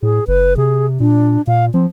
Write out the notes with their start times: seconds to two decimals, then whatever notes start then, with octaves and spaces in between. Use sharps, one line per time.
0.03 A2 G#4
0.28 F#1 B4
0.57 C3 G#4
1.00 A#2 D4
1.47 A#2 F5
1.74 F3 C4